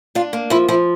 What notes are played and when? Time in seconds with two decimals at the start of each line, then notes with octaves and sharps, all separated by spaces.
0.15 D4 F4
0.33 A#3
0.50 F3 E4
0.68 F3 E4